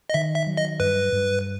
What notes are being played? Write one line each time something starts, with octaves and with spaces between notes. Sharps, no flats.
D#5
D#3 E5
E5
F#3
D#5
G2 B4
G2